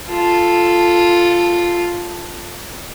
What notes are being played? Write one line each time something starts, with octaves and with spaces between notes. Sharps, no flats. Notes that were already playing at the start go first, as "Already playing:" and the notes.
F4 A4